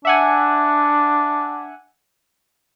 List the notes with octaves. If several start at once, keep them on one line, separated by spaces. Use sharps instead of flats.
D4 E5 F#5 G#5